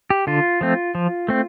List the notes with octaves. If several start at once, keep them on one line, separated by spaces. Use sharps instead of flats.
G4
D3 F4
F3 A3 C4
F3
A3 C4